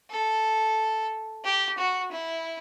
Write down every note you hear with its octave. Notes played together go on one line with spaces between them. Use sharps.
A4
G4
F#4
E4